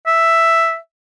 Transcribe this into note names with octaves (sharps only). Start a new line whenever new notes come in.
E5